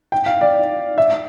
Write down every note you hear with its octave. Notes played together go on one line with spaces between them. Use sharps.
G5
F5
D5
E5